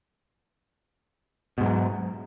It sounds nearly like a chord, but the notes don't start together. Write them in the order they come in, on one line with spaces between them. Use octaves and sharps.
B2 G#2 F#3